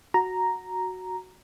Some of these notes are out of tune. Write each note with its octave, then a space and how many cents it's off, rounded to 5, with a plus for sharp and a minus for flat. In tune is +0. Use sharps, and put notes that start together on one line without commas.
F#4 +0 A#5 +0